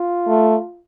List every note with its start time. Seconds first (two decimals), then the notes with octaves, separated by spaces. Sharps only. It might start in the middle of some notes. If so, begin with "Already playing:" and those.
Already playing: F4
0.27 A3